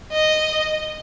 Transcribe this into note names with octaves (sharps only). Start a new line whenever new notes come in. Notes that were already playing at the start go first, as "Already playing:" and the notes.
D#5